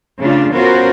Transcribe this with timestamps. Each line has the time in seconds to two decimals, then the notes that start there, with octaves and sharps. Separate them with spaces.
0.20 C#3 A3 D4 F4
0.53 B3 C#4 F4 F#4 A#4 C5